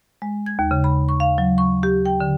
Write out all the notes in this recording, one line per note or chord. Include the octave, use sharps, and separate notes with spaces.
G#3
G#6
D#2
C#3
B5
C#6
F5
F#3
C#6
G4
G5
D3